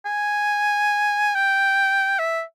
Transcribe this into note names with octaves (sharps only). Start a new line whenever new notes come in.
G#5
G5
E5